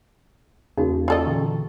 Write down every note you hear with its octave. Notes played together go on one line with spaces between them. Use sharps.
E2 C#3 A#3 D#4 F#4 A#4
F4 G#4 A4 D#5 G5 A#5
A#2 D3 E3 C#6